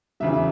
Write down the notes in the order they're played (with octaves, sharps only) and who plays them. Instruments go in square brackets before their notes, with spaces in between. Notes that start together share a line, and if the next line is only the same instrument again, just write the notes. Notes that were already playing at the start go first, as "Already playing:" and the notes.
[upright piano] E2 C#3 F#3 E5